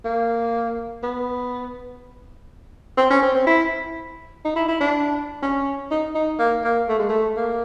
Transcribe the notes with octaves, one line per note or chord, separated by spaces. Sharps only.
A#3
B3
C4
C#4
C4
C4
E4
D#4
E4
E4
D4
C#4
D#4
D#4
A#3
A#3
A3
G#3
A3
A#3